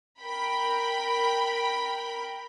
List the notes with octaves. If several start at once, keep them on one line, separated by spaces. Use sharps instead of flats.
A#4 G5 B5